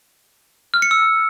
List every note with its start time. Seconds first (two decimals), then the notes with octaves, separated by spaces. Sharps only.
0.74 F6
0.82 C#7
0.91 E6